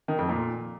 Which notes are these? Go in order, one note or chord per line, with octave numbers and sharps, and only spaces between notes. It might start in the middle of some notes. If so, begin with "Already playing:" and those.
D#3
F2
A#2